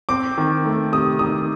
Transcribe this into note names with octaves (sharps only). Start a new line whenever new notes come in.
C4 D6
D#3
A3
C3 D#6
D#3 D#6